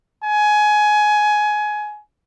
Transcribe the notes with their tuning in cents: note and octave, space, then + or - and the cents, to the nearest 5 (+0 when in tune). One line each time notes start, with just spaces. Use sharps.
G#5 +20